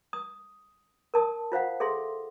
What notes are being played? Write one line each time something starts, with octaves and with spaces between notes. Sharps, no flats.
D#6
A#4 A5 D#6
F4 C5 F5 F#5
G#4 A4 E5 C6